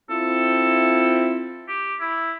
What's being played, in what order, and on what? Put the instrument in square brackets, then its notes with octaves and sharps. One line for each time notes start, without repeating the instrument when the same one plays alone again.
[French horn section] C4 E4 F4 [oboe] A4
[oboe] G4
E4